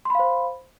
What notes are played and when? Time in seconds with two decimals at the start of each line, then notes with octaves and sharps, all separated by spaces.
0.05 C6
0.10 B5
0.15 F5
0.19 C5